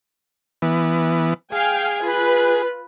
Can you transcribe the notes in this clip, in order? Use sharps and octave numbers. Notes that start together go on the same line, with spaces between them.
E3 B3
G#4 F5 G5 G#5
F4 B4